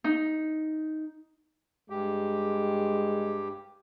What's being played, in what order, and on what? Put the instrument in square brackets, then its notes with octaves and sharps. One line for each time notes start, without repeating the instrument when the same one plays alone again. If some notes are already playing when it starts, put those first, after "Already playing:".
[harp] D#4
[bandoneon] G2 G4 [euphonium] G#3